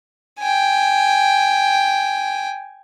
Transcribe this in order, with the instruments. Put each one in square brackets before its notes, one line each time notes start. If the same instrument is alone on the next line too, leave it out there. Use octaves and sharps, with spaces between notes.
[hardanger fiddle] G5 G#5